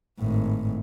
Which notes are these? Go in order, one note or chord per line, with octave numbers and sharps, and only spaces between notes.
G#1 A2